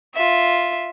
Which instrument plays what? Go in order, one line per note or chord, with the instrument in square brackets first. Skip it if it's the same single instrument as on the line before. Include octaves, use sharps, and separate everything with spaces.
[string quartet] F4 E5